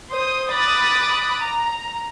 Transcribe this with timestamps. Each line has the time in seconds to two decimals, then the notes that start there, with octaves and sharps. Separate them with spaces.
0.11 C5 D#6
0.50 B5 D6 D#6 F#6 A6
1.42 A#5